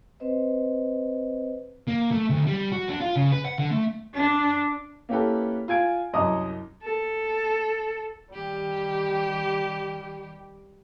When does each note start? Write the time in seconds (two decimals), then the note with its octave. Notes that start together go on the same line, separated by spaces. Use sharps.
0.20 C4 B4 C5 D#5
1.88 A#3
2.11 A3
2.30 D2
2.47 G3
2.72 F#4
2.89 D4
3.01 F4
3.16 C#3
3.32 B4
3.45 F#5
3.58 D3
3.71 A3
4.14 D4
5.09 A#3 C#4 E4 G4 A4 B4
5.68 F4 G#5 G#6 D7
6.13 C2 F#2 D#5 A#5 D6 D#6
6.83 A4
8.34 D#3 G3 G4